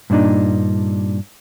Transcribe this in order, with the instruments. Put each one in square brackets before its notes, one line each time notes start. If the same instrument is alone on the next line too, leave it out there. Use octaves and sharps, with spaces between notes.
[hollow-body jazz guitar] G2 A#2 G#3 D4 D#4